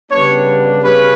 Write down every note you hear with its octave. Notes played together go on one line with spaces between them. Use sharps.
C#3 G3 B3 D4 C#5
C#3 G3 C#4 B4